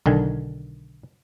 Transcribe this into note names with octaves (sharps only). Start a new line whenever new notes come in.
B1 D3 D#3 G#5